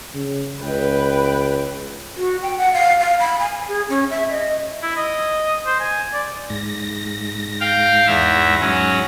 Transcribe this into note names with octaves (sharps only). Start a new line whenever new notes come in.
C#3
C#2 B4 G5
F#4
G5
F#5
F5
F5
B5
G#5
G#4
C#4
E5
D#5
E4
D#5
C5
G#5
D5
G#2 A#6
F5 G5
E2 E5
F#3 C#4